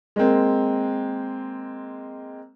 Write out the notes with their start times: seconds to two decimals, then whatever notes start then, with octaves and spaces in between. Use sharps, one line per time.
0.16 G#3 A#3 C4